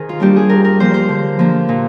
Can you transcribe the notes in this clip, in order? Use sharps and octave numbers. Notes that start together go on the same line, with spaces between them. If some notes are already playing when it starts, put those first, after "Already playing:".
Already playing: D#3 G#4 A#4 C5
F4
G3 A#3 D4 G4
G#4
G2 A#4
A#4
F3 A#3 C5
C5
D3
F3 A#3 D4
A#2